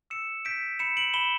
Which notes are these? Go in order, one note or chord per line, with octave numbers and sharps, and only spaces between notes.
E6 C#7 E7
G6 B6 D7
B5 C#7 E7
D7 F#7
B5 E7 G7